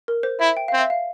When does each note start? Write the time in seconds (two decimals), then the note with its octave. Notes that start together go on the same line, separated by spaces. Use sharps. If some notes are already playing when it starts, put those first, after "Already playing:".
0.08 A#4
0.23 C5
0.40 E4 E5
0.57 G5
0.68 C4 F5
0.79 E5
0.90 F5